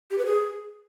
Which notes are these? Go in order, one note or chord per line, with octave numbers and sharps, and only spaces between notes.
G4
B4
G#4